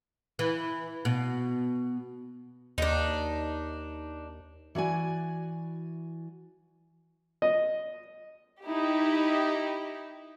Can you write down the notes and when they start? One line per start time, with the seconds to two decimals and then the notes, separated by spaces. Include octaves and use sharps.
0.39 E3
1.05 B2
2.78 D#2 D4 D#4
4.75 E3 F#4 D5 G#5
7.42 D#5
8.64 D#4 E4 G4